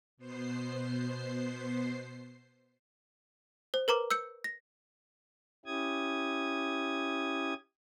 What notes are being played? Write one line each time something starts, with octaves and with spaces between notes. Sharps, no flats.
B2 B3 C5 C7
C5
A#4 B4 A#5 D6
E6 G6 C#7
A#6
C#4 E4 G4 D#6 G#6